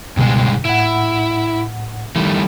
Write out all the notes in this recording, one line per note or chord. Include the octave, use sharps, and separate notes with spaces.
C#2 G2 B2 D3 G#3
A2 E4 F#5
D#3 E3 G3 A3